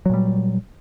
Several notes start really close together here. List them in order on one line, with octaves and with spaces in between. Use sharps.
F#3 A#2 G3